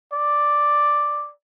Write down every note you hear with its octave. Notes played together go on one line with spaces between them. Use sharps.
D5